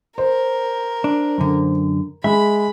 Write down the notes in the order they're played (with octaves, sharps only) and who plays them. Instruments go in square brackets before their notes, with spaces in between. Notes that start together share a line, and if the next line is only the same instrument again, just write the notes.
[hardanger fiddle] A#4 [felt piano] C5
[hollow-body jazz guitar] D4
F#2 D3
[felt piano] G#3 [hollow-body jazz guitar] E5 [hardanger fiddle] B5